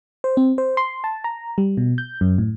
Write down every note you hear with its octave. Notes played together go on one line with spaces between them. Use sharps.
C5
C4
C5
C6
A5
A#5
G3
B2
G6
F#2
A2